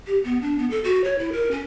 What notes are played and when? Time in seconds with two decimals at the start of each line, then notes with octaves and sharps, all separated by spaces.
0.07 G4
0.24 B3
0.41 D4
0.58 B3
0.70 A4
0.84 F#4
1.04 C#5
1.19 E4
1.33 A#4
1.51 C#4